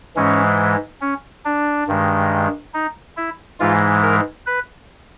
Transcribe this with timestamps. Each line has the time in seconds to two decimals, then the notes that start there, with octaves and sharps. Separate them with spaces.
0.16 G#2 E3 G#3 C#4
1.01 C#4
1.45 D4
1.87 G2 D#3 G#3
2.74 D#4
3.17 E4
3.60 G#2 E3 G#3 F4
4.02 A#4
4.46 B4